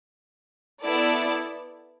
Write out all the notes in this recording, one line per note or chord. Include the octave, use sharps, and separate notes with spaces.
B3 E4 A4 D5